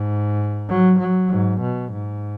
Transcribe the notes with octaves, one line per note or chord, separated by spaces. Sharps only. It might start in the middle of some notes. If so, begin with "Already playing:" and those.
Already playing: G#2
F#3
F#3
G#2
B2
G#2